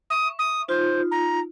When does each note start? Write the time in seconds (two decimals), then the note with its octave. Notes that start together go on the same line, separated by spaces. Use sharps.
0.10 E5 C#6 D#6
0.39 D#6
0.69 D#4 F4 C5
1.11 A#5